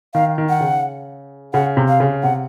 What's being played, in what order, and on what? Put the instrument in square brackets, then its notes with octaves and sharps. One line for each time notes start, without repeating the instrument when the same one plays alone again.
[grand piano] D#3 [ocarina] F5
[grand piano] D#3
[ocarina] F#5
[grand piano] C#3
[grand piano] C#3 [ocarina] F#5
[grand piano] C3
[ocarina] F5
[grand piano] C#3
[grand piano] C3 [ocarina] F#5